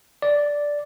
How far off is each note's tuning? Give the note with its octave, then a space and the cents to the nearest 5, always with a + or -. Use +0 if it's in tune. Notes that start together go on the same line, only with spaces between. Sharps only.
D5 -5